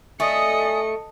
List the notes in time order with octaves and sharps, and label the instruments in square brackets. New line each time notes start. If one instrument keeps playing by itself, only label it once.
[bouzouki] A3 [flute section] D5 G#5 D#6 [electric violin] D#5 C#7